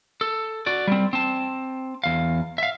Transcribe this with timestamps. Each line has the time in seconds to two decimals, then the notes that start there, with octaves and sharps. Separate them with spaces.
0.21 A4
0.66 F#4 D5
0.87 G3 C4
1.13 C4 A5
2.04 E2 F5
2.58 E5 F5